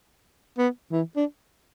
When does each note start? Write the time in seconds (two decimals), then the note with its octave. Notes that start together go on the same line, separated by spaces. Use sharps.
0.58 B3
0.92 E3
1.16 D4